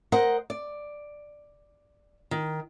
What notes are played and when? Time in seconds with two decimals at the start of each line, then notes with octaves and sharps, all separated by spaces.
0.12 A#4 C5 D#5 F#5
0.50 D5
2.31 D#3